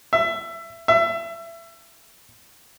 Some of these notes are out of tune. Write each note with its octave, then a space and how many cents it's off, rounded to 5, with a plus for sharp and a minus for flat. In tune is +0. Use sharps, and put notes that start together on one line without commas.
E5 +20
E5 +25